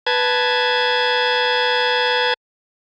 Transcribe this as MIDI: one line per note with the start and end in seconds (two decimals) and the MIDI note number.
0.07 2.34 71
0.07 2.34 81
0.07 2.34 92